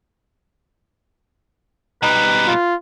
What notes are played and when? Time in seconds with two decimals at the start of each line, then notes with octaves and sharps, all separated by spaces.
2.03 B2 G3 D#4 B4
2.48 F4